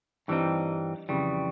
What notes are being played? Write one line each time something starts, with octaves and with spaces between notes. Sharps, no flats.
G2 E3 G3 C4 D#4
F2 C#3 E3 G3